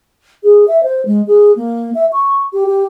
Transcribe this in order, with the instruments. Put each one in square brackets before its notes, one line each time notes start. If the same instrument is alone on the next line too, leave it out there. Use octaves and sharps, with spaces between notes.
[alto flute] G#4
E5
C5
G#3
G#4
A#3
E5
C#6
G4
G4